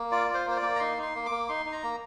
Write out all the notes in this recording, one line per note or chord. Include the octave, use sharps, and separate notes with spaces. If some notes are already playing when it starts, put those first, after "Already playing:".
Already playing: A#3
F4 D5
F4
C5
A#3 C5
D5
A#3
A#5
D#4 C6
D#4 C6
A#3
D6
A#3
D#4 C6
D#4
A#5
A#3